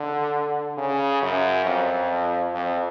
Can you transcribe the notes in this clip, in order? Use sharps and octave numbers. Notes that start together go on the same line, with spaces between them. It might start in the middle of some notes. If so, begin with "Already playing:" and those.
Already playing: D3
C#3
F#2
F2
F2